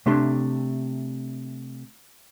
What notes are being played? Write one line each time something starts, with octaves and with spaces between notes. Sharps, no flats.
C3 A3 D4 G4 C6